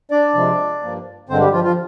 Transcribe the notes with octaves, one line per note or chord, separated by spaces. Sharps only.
D4 D5
C3 F3 G#3
G2 F3 A#3
G2 D3 G#3 C4 C5
G3 G4
F3 F4
F3 F4